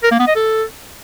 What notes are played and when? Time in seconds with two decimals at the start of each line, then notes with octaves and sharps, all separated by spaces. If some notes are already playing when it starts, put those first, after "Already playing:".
0.03 A#4
0.11 A#3
0.19 B3
0.27 D#5
0.35 A4